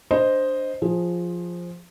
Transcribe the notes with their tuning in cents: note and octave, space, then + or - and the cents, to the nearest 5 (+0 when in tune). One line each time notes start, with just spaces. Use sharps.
D4 +0 C5 +0 D#5 +0
F3 +5 G#4 +0